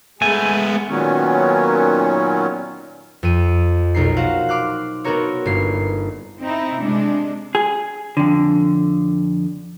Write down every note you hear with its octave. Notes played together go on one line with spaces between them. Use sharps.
G#3 A3 B3 G#4 G#5
A#2 D#3 F#3 B3 C#4
F2 D#7
B1 D#4 A#4 C7
F4 F#4 C5 F5 F#5
C6 D6 F6 F#6
B3 C4 D#4 F#4 A#4 C#5
G1 A#3 C7
C4 D#4 E4
C3 G#3 D4
G#4
F2 D3